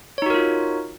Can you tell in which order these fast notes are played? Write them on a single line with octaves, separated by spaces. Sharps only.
C#5 D#4 F#4 A#4 F4